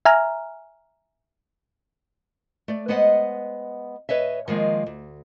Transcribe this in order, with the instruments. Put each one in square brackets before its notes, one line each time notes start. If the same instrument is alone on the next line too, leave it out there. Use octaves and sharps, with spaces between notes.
[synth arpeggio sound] E5 G#5 A#5 F6
[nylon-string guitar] A3 D5
G#3 B3 C5 D#5 F#5
B4 C#5 D#5 E5
D#3 F3 G#3 A#3
D2